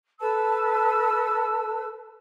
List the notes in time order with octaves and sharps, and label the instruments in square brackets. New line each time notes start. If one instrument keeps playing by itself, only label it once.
[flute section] A4 B4 A5 E6